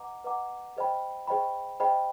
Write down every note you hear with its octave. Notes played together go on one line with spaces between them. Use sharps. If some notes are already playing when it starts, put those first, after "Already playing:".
Already playing: B4 D#5 F#5 A#5 D6
B4 D#5 F#5 A#5 D6
G#4 C5 D#5 G5 B5
G#4 C5 D#5 G5 B5
G#4 C5 D#5 G5 B5